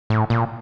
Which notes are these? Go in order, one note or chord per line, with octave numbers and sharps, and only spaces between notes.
A2
A#2